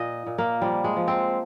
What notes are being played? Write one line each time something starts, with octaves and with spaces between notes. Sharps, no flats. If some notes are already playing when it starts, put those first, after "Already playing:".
Already playing: A#2 D#5
A#2
A#3
F3 G3
G#3
F3
C4